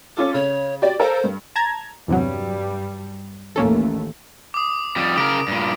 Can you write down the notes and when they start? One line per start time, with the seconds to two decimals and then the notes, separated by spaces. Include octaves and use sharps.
0.17 C#4 F4 A4 D6
0.34 C#3 C#5
0.82 F#4 G4 D5
1.00 A4 A#4 C5 F5
1.24 G2
1.56 A5 A#5 G#6
2.08 E2 G2 C3 F#3 G3
3.56 A1 D#2 A3 A#3 C#4 A4
4.54 D6 D#6
4.96 F2 G3
5.16 C#3 A#4 D6 D7
5.48 G2 A#2